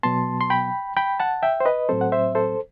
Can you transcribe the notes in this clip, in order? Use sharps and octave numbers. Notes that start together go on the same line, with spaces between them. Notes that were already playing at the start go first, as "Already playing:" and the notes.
B2 F#3 B3 A5 C6
C6
G5 B5
G5 B5
F#5 A5
E5 G5
C5
B4 D#5
A2 F#3 C4 A4 C5
F#5
C5 E5
A4 C5